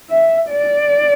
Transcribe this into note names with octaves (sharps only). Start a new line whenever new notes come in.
E5
D5